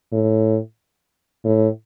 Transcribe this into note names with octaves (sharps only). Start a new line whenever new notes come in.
A2
A2